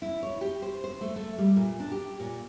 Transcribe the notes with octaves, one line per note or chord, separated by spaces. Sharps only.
E4
C#5
G4
C5
C5
A3
A3
G3
A#2
D4
G4
A#2